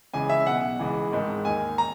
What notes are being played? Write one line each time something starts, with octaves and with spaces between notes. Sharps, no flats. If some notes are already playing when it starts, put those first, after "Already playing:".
C#2 C#3 E3 G#5
E5
B1 B2 F#5
C#2 C#3 E3
G#1 G#2 D#3
D#2 D#3 G#5
A#5